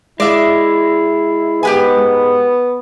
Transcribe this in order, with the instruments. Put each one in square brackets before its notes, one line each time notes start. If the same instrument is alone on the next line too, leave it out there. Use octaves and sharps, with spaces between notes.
[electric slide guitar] G#3 [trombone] E4 [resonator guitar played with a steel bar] D5 E5
[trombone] G#2 [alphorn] B3 [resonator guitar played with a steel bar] G4 B4 G#5